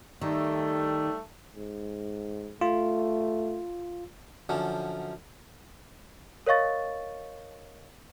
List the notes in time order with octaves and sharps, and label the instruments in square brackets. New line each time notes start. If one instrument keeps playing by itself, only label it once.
[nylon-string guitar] D#3 [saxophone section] G3 A3
[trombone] G#2
[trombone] A3 [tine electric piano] F4
[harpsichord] F#2 D3 F3 C#4
[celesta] A#4 C#5 D#5 F5 C#6 A6